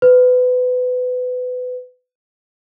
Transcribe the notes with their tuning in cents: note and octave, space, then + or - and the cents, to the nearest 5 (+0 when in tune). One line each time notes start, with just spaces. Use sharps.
B4 +25